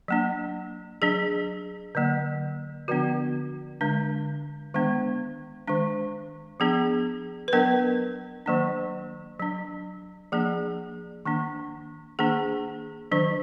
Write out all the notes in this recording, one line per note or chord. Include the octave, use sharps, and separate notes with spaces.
F#3 A#3 D4
F#3 D4 G#4
D3 F#3 A#3
D3 F3 B3 D4 F#4
D3 G#3 D4
D#3 G#3 B3 D4
D#3 G#3 D4
F3 B3 D4 G#4
B4
F#3 B3 D4 A#4
D#3 F#3 A#3 D4
F#3 D4
F3 A#3 D4 G#4
D#3 A#3 D4
D#3 A#3 D4 G#4
D#3 F#3 D4